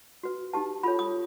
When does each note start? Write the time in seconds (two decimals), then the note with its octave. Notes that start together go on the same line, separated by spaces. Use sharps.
0.23 F#4 B4
0.53 D#4 G4 B4 A5
0.83 F4 A4 C#5 B5
0.99 D#6